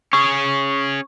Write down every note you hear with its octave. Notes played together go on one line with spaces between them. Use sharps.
C#4 G#4 C#6